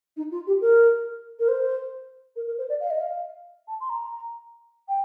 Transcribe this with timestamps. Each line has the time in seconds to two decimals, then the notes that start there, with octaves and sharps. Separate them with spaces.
0.17 D#4
0.31 F4
0.47 G4
0.61 A#4
1.40 A#4
1.48 C5
2.36 A#4
2.47 A#4
2.58 C5
2.69 D5
2.80 F5
2.90 D#5
3.01 F5
3.68 A5
3.81 C6
3.89 A#5
4.89 G5